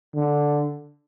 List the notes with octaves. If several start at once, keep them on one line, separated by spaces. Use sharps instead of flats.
D3